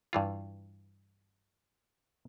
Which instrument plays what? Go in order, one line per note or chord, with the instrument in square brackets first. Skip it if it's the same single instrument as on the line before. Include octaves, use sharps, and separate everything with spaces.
[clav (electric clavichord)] G2 E3 F4